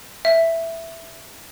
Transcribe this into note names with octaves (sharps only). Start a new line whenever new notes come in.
E5